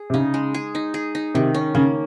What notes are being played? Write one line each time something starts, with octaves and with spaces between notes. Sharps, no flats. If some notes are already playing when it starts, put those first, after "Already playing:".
Already playing: G#4
C3
C#3 D#4
G#3
G#4
D#4
G#4
D#4
C3 D#3
C#4
C#3 A#3